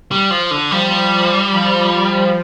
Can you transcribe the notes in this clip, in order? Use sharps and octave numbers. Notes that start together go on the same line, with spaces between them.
G3
F3
D3
F3 G3
F3